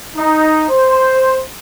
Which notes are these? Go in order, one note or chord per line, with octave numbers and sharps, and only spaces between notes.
D#4
C5